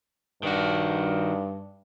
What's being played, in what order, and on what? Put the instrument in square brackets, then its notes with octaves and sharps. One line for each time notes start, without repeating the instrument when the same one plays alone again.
[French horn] G2 [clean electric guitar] D#3 F#4